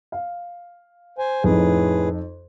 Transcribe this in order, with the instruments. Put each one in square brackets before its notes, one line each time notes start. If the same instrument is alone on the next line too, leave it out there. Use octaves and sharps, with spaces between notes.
[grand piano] F5
[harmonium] C5 G#5
[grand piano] F2 D#4 [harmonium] A2 G#4 B4